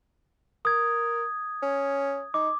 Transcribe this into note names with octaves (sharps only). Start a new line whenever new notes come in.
A#4 D#6 G#6
C#4
D#4 D6